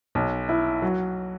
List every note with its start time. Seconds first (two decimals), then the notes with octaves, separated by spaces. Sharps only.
0.15 B1
0.49 E4
0.82 F#3